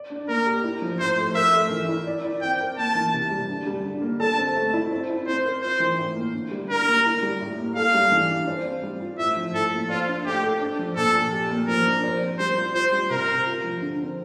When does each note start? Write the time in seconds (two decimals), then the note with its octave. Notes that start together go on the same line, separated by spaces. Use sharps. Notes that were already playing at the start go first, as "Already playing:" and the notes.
Already playing: D5
0.10 D4
0.28 A#3 A#4
0.46 G4
0.64 E4
0.82 F3
1.00 A2 C5
1.17 A3
1.35 A#4 E5
1.53 A3
1.70 E3
1.88 E4
2.07 D5
2.24 E4
2.41 C4 G5
2.60 A#4
2.77 A#3 A5
2.95 E3
3.13 C3
3.31 G3
3.49 D3
3.67 G3
3.84 D3
4.02 A#3
4.20 A4 A5
4.38 C4
4.55 A3
4.73 E4
4.91 C4
5.09 E4
5.27 C4 C5
5.45 A#4
5.62 F4 C5
5.80 E3
5.98 A2
6.16 A#3
6.34 D3
6.51 G3
6.69 D3 A#4
6.87 A#3
7.05 E4
7.22 G3
7.41 A2
7.58 A#3
7.76 A4 F5
7.94 G3
8.12 E3
8.29 D4
8.47 C5
8.65 C4
8.83 G3
9.01 F4
9.19 A2 E5
9.37 F3
9.54 A2 A4
9.72 A#3
9.90 F4 C5
10.08 D4
10.25 A3 G4
10.43 A4
10.61 D4
10.79 F3
10.96 A#2 A4
11.14 A#3
11.32 G4
11.50 A#3
11.68 F3 A#4
11.86 D4
12.03 C5
12.21 C4
12.39 G3 C5
12.57 F4
12.75 F4 C5
12.92 G3
13.10 C3 A#4
13.28 C4
13.46 F4
13.64 F3
13.81 D3
13.99 C4